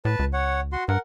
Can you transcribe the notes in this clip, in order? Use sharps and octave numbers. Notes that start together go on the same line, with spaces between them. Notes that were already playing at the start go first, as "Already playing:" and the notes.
A2 B4 A5
C#2
C#5 F#5
F#4 C6
G2 A#4 F#5